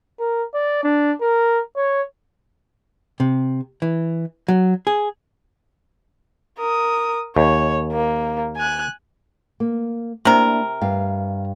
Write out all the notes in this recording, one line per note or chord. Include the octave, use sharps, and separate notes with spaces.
A#4
D5
D4
A#4
C#5
C3
E3
F#3
G#4
A#4 D#6
D#2 C#5
A#3
G#5 F#6
A#3
C3 A#3 D4 E4 A#4
G2 F5